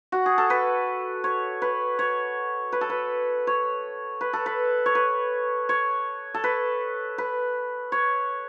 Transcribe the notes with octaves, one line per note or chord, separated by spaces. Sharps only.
F#4
G#4
A4
B4
C#5
B4
C#5
B4
A4
B4
C#5
B4
A4
B4
C#5
B4
C#5
A4
B4
B4
C#5